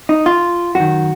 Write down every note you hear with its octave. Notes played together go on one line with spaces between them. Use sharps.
D#4
F4
F#2 D#3 F#4